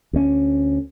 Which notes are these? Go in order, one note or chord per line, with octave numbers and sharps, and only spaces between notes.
D2 C#4